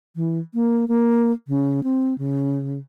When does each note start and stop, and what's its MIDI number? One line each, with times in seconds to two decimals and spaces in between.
0.16 0.39 52
0.54 0.88 58
0.88 1.32 58
1.48 1.83 49
1.83 2.16 60
2.18 2.79 49